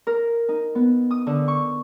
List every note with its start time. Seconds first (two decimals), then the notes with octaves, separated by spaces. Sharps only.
0.07 A#4
0.49 D#4
0.75 B3
1.11 D#6
1.27 D3
1.48 C#6